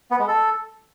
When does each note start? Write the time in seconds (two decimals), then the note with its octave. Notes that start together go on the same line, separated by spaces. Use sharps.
0.11 B3
0.19 G#3
0.28 A4